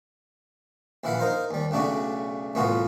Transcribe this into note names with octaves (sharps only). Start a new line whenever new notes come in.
A#1 E3 E4 F5 F#5 B5
D#4 A#4 C5 F5
D#2 G3
B1 C#3 A3 D4 F#4
C2 A2 E3 B3 F4 F#4